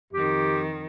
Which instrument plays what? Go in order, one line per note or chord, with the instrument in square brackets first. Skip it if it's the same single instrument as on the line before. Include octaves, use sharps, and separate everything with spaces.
[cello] F2 D#3 [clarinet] G4